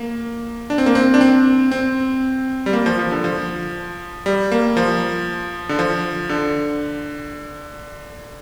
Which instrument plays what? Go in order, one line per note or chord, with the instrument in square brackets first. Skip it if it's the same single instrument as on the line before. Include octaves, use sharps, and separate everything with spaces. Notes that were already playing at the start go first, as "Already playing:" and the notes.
Already playing: [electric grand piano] A#3
D4
C4
A#3
C4
D4
C4
C4
G3
A#3
F3
F3
D3
F3
G3
A#3
F3
D3
F3
D3